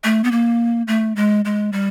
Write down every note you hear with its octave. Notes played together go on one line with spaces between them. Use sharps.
A3
B3
A#3
A3
G#3
G#3
G3